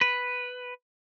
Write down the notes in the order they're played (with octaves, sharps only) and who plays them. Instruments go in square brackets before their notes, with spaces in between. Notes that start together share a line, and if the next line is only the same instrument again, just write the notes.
[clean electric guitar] B4